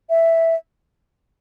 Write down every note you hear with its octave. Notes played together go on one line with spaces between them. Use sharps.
E5